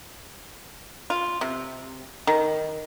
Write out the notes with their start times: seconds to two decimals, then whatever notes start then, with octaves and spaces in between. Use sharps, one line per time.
1.10 F4
1.41 C3
2.27 D#3